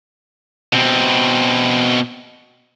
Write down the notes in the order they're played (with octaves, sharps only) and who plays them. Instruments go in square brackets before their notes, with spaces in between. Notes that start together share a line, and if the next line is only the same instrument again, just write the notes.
[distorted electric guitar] B2 C4